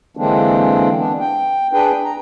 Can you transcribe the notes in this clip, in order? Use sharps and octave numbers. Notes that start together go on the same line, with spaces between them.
D3 E3 G#3 A#3 C4 D4
B3 D4
G5
D4 G#4 B4 G5
A#5